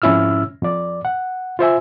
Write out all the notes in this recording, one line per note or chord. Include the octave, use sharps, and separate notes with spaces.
F2 G#2 C#4 E4 E6 F6
F2 D5
F#5
F4 C5 E5 G#5